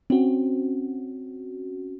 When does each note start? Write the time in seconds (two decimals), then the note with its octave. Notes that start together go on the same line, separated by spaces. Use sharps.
0.10 C4 C#4 F#4